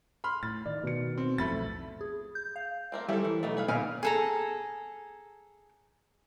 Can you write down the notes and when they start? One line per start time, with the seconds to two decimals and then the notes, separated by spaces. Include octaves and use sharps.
0.24 B5 C6 F6
0.43 A2 A6
0.66 D#3 D5
0.83 B2 D#3 C#7
1.18 C4
1.38 B1 F2 A2 A3 B5 A6
2.01 G#4
2.35 G6
2.56 F5
2.92 A3 A#3 C4
3.09 G3 A#3 C4 C#4 E4 A4
3.25 E3
3.43 B1 A3 B3 D#4 G#4
3.57 G#4 B4 F5
3.68 A#2 B3 D4 D#4 F5 G#5 F6
4.03 G#4 A4 A#5